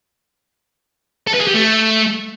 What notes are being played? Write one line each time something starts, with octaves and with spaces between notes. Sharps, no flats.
A4
B4
G#4
G4
A3